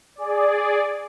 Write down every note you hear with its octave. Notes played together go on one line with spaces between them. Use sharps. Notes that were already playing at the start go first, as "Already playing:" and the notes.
G#4 D5